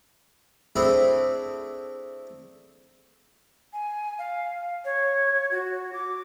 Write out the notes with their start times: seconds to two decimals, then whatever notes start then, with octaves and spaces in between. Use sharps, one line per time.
0.76 A3 C4 D4 E4 G#4 A4
3.73 G#5
4.19 F5
4.85 C#5
5.51 F#4
5.93 D6